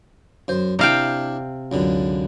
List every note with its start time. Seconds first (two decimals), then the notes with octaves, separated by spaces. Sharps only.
0.48 F#2 C5
0.79 C3 D4 E4 F5 G5 B5
1.72 C#2 F#2 D3